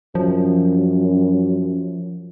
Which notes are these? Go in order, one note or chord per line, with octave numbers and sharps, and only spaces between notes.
F#2 F3